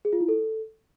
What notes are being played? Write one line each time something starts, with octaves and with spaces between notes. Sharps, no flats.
G#4
F4
E4
A4